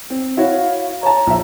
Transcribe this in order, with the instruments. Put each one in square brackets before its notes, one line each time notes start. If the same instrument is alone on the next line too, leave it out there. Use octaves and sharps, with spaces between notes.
[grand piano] C4
[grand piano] E4 F#4 C#5 [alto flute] F5
[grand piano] C#5 A5 [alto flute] A#5
[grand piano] A#1 E5